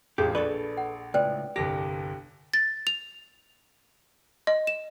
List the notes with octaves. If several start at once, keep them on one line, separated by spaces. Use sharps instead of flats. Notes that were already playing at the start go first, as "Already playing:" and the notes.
E1 A1 F4 G4 G#4 G6
A#1 A4 B4 D5 C#6
F#5
C#2 A2 B4 C5 D5 G5
G1 C2 G4 A#6
A6
F7
D#5
E7